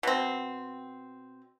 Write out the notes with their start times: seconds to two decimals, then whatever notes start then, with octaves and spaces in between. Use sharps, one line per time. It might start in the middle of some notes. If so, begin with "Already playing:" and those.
0.03 B2 C4